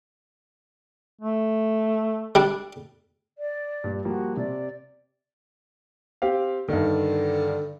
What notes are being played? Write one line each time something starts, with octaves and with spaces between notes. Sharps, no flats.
A3
G3 D4
D5
G2 A#2 G3
F3 G3 A#3 F#4
C3 D5
C4 G4 F5
G2 D3 D#3